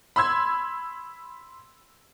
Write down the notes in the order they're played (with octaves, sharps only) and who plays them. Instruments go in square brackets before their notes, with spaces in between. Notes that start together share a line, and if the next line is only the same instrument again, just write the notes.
[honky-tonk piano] B5 C6 E6 G#6